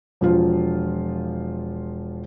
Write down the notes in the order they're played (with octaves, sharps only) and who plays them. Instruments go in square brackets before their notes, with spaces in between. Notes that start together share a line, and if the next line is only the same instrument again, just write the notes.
[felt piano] E1 F3 F4